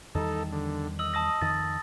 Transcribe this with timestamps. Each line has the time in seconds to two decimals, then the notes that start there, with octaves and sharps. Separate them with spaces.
0.15 E2 D#3 G3 D#4 A4
0.52 D3
0.99 D#5 E6 F#7
1.14 A5 D#6 A#6
1.42 F2 D#3 A6